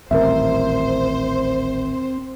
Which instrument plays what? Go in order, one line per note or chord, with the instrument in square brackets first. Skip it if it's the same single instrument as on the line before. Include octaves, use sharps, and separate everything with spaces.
[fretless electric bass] D#1 A1 [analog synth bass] C4 [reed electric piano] A#4 E5 [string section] C5